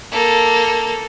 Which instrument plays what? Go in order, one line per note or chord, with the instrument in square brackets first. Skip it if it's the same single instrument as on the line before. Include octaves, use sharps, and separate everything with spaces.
[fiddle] A#3 A4